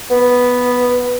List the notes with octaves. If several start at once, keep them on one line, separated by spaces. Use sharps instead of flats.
B3